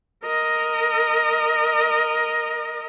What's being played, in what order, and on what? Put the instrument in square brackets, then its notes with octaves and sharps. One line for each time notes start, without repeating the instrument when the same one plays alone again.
[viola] A#4 D#5